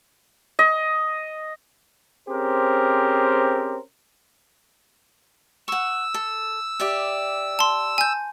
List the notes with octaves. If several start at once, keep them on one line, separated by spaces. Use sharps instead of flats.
D#5
C4 C#4 G4 G#4 A#4 C5
F#5 C#6 E6
A4
G4 D5 E5
A5 C6
G#5 G6